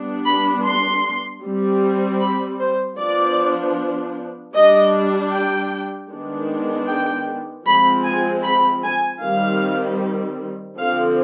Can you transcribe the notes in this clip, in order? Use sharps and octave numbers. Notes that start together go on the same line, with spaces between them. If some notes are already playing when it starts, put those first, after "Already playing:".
Already playing: G3 B3 D4
B5
C6
G3 C4
B5
C5
F3 B3 D4 D5
G3 D4 D#5
G5
D#3 G#3 B3 D4
G5
F3 G#3 C4 B5
G#5
B5
G#5
D#3 G3 C4 F5
D3 F3 C4 F5